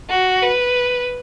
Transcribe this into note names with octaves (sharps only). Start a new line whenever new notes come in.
F#4
B4